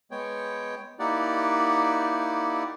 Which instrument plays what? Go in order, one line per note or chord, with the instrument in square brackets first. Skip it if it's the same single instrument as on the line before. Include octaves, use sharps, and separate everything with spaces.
[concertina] G#3 B3 C#5 G5
A#3 D#4 E4 G4 D5 F#5